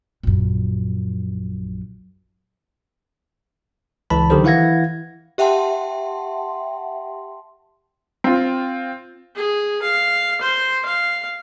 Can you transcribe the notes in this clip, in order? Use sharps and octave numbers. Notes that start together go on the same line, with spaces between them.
A#1 F#2
C#2 E3 A5 B5
D3 D#3 F#3 G4 A4 C5
E3 E4 F5 F#5 G#6 A#6
G4 E5 F#5 G5 A5 C6
C4 F4
G#4
F5
C5
F5